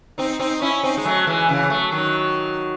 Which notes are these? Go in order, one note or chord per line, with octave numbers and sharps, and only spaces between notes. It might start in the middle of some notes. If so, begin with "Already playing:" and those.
C4 D#4
C4 D#4
C#4 E4
C4 D#4
G#3
F#3 A3
E3 G#3
C#3 E3
F#3 A3
D#3 F#3